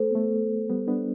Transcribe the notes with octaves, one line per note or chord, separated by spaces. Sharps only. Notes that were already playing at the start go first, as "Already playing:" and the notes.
Already playing: A3 A4 C5
B3
A3
G3 B3
B3 D4